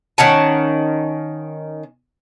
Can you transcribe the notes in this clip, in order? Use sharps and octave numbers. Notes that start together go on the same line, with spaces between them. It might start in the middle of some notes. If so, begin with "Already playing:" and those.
D#3 C#4 F#5 A5